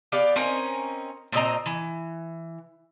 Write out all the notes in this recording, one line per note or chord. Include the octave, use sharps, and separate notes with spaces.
B3 G4 D5 F5
C4 C#4 D#4 A#4
A#2 C4 D#5 A#5
E3